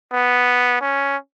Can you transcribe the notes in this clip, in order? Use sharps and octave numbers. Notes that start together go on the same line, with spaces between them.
B3
C#4